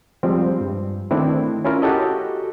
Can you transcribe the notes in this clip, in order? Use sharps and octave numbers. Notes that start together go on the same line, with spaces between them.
F3 G3 G#3 C4
G2
D#3 A3 B3 C4 D4 E4
C#4 E4 F4 A#4
F#4 G4 A4 D#5